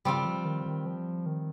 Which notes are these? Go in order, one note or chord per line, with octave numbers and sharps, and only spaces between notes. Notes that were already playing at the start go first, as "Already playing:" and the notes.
C#3 G3 C4 F4
F3
D#3
D#3
F3
D#3